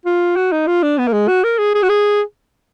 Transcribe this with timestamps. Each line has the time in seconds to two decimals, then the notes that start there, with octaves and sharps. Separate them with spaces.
0.05 F4
0.36 F#4
0.52 D#4
0.67 F4
0.83 D4
0.98 B3
1.07 A#3
1.13 G#3
1.28 F#4
1.44 A#4
1.58 G#4
1.75 G#4
1.83 F#4
1.89 G#4